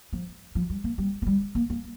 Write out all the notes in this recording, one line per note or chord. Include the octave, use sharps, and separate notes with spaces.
F3
F3
G3
A#3
G3
A#3
G3
A#3
A#3